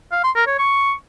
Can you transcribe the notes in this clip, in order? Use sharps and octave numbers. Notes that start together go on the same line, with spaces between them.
F5
C6
A#4
C#5
C#6